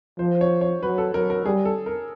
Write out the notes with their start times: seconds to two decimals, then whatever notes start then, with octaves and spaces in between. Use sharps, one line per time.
0.19 F3 C5
0.41 C#5
0.61 C#5
0.83 F#3 B4
0.98 A4
1.14 F#3 A#4
1.30 A#4
1.45 G3 G#4
1.65 A4
1.86 A#4